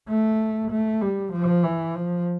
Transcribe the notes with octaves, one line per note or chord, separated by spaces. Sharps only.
A3
A3
G3
F3
E3
F3